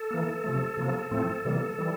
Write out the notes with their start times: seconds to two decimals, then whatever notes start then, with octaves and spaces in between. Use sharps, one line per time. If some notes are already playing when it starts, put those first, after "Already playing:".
Already playing: A4
0.11 E3 A#3
0.44 C3 F3 A3
0.77 C3 F3 A#3
1.11 A2 F3 A3 C4 A4
1.45 C3 E3 G3 A#3
1.79 E3 G3